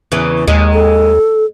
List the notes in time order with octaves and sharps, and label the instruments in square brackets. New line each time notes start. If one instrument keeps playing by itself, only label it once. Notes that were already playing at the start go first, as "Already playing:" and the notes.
[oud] E2 C#3 E3
[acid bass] D#2 [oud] G#3
[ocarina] A4